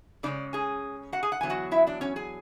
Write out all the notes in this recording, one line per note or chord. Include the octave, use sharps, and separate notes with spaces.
C#3 G#3 C#4 D4 D5
G#4 G#5
F#4 F#5
G#4 G#5
F#5
E2 D3 F#3 B3 G#5
F#4 F#5
E4 E5
D4 D5
C#4 C#5
G#4 G#5